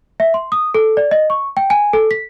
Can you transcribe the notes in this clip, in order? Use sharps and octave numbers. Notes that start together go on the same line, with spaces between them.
E5
C6
D#6
A4
D5
D#5
C#6
G5
G#5
A4
B6